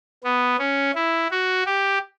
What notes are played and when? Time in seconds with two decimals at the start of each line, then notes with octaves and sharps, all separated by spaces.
0.24 B3
0.59 C#4
0.95 E4
1.31 F#4
1.66 G4